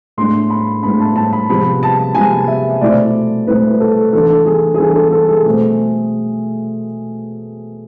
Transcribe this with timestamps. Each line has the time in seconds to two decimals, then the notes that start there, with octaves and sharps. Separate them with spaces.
0.17 A2 G#3 B3 D4 C6
0.50 B5
0.83 A2 G#3 B3 D4 B5
1.00 A5
1.16 A5
1.33 B5
1.49 C3 F3 G#3 B3 B5
1.83 A5
2.15 C3 F3 G#3 B3 G#5
2.48 E5
2.81 B2 A3 C4 E4 D5
3.47 B2 A3 C4 E4 B4
3.80 A4
4.13 E3 B3 D4 A4
4.46 G#4
4.74 G#4
4.79 E3 B3 D4 A4
4.96 A4
5.12 A4
5.28 G#4
5.45 B2 A3 C4